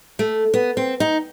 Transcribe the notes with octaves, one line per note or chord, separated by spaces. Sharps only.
A3
B3
C4
D#4